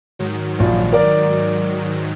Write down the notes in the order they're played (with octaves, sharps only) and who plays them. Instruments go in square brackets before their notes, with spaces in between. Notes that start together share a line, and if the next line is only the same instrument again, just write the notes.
[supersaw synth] G#2 D#3 F#3
[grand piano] A#1 F3
A#4 D5